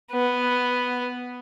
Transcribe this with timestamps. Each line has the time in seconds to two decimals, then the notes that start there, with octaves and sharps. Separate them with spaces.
0.12 B3